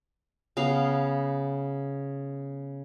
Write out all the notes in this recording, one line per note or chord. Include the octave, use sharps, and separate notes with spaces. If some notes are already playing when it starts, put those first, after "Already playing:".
C#3 B3 F5